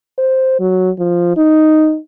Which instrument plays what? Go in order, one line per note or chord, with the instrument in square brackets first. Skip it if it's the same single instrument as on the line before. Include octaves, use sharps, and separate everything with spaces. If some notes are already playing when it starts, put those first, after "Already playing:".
[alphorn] C5
F#3
F3
D#4